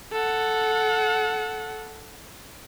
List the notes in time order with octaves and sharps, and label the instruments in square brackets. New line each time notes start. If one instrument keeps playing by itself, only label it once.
[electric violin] A4 F#5